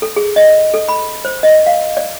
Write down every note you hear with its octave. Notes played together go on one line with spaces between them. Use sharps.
A4
G#4
D#5
A4
B5
C5
D#5
F5
D5